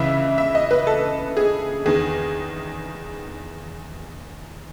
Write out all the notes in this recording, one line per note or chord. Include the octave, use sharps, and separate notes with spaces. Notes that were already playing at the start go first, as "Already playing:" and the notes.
Already playing: C#2 C#3 E3 E5
E5
D#5
B4
A4
G#4
E2 D#3 G#4